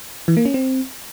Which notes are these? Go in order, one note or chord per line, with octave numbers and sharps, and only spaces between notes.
E3
A#3
C#4
C4